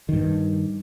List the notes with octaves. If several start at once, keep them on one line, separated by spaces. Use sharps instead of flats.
G2 D#3